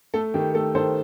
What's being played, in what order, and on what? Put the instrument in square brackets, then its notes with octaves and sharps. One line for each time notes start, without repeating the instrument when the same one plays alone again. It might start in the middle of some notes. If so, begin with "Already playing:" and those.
[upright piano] A3 A4
D#3 G4
A3 A4
D#3 A4 C5